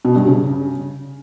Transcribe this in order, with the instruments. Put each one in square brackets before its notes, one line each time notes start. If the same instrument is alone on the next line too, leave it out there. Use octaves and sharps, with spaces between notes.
[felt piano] B2
G2
C#3